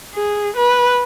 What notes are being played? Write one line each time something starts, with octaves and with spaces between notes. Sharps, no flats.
G#4
B4